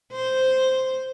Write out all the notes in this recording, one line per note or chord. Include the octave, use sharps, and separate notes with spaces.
C5